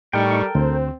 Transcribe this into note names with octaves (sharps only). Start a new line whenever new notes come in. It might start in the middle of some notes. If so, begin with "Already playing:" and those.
A2 G3 D#4 A4 A#4 G5 C#6
D2 C4 C5